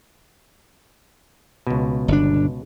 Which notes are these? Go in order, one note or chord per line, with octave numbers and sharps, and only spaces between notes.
C#2 B2
G1 D4